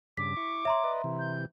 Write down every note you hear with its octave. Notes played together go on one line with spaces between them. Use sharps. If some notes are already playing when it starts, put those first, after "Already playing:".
G2 C#3 D6 B6
E4 C#6
C#5 E5 A#5 C6
B4 D5 D#5
C3 E3
G6